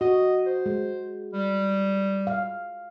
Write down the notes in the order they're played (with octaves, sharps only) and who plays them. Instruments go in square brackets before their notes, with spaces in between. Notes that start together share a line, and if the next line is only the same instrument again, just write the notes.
[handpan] F#4 [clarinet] D#5
[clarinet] C5
[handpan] G#3
[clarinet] G3
[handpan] F5